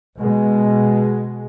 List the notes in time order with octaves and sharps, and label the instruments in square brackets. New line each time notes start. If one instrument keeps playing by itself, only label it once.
[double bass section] B2 G#3